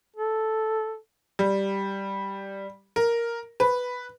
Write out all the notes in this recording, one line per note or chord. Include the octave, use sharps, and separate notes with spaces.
A4
G3
A#4
B4